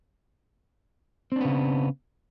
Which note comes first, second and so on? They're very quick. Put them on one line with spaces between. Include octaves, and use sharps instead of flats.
C4 D4 B3 C#3